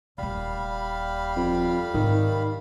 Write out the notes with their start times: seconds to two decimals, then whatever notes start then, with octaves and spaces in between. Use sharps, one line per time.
0.18 D#1 G3 A#3 F5 B5
1.36 F2
1.94 G#2 D#3